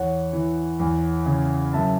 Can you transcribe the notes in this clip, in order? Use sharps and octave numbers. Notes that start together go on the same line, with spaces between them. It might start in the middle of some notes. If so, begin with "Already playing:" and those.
Already playing: E2 C#5 F#5
E3
E2
C#3
F#2 E5 A5